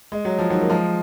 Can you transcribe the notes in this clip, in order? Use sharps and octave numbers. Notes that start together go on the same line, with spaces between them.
G#3
F#3
F3
D#3 F#3
A#3
F3 G#3